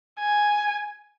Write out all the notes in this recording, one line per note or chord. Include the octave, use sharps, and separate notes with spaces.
G#5